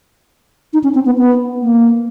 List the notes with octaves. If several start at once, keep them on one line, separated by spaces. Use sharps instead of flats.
D#4
C#4
C4
B3
B3
A#3